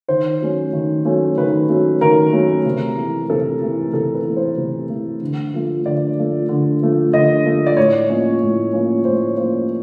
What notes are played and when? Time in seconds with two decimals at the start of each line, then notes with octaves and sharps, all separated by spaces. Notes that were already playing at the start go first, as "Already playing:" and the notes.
0.08 D#3 C5
0.41 F#3 A3 C#4
0.73 D#3
1.05 F#3 A3 C#4
1.38 D#3 B4
1.69 F#3 A3 C#4
2.01 D#3 A#4
2.33 F#3 A3 C#4
2.65 C3
2.97 E3 A3
3.30 C3 A4
3.62 E3 A3
3.93 C3 A4
4.14 B4
4.25 E3 A3
4.36 C5
4.57 C3
4.90 E3 A3
5.21 D3
5.54 F3 A3
5.85 D3 D5
6.17 F3 A3
6.49 D3
6.82 F3 A3
7.13 D3 D#5
7.45 F3 A3
7.66 D5
7.77 A2 C#5
8.09 F3 A#3 C#4
8.41 A2
8.73 F3 A#3 C#4
9.05 A2 C5
9.37 F3 A#3 C#4 C5